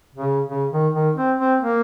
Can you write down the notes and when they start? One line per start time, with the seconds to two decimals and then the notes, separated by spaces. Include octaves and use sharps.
0.15 C#3
0.48 C#3
0.71 D#3
0.94 D#3
1.16 C4
1.38 C4
1.61 A#3